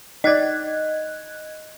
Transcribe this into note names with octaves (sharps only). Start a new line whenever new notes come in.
D#4 D5 D#5 F#6 G#6